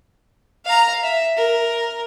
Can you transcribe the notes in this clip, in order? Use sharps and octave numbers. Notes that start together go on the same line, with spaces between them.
F5 A#5
E5
A#4